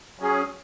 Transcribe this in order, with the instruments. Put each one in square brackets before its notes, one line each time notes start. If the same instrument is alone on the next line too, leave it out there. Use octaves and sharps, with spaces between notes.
[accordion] F#3 C#4 G#4